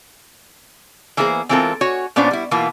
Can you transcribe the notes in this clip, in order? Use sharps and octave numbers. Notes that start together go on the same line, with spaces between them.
E3 A#3 B3 D4 G#4 C5
E3 G#3 C4 F4 A4 A#4
F#4 C#5 G#5
A#2 B3 C#4 D4 C5
G3 E4
B2 E3 A#3 F4